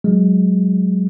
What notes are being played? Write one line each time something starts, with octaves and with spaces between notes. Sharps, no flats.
F#3 G#3